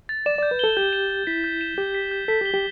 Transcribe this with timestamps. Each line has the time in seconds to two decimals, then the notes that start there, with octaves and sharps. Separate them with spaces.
0.09 A6
0.26 D5 E7
0.38 D5 G6
0.51 B4
0.59 A4 G7
0.77 G4 G6
0.93 E7
1.10 G6
1.27 E4 B6
1.44 G6
1.61 E7
1.78 G4 G6
1.95 B6
2.11 G6
2.28 A4 B6
2.41 G4
2.46 G7
2.54 G4